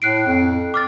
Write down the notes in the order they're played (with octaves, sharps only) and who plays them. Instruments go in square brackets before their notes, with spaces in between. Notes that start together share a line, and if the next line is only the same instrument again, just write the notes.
[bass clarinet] A2 [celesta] F#6 C7 D7
[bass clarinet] F2
[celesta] D6 F6 A6